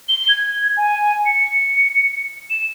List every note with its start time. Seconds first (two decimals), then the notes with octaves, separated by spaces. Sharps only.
0.08 G7
0.29 G#6
0.77 G#5
1.26 C#7
2.50 E7